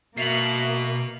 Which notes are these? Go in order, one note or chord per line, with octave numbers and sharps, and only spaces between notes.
B2 A#3 F#4 E5 C7 F7 F#7